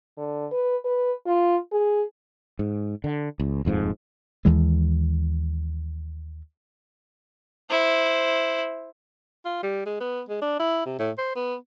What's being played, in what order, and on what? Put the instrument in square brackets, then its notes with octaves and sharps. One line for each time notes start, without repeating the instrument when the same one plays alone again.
[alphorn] D3
B4
B4
F4
G#4
[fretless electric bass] G#2
D3
C#2
D#1 F2 G#2 F3
[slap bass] D#2 E3 G#3
[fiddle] E4 C5
[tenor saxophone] F4
G3
G#3
B3
G#3
D4
E4
C3
A2
C5
B3